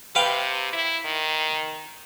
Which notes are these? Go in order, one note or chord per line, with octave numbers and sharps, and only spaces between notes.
C3 B4 F5 G5
E4
D#3